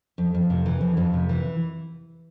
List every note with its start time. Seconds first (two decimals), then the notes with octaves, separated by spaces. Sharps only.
0.18 F2
0.34 F2
0.50 C3
0.66 E3
0.81 F2
0.97 F2
1.13 C3
1.29 E3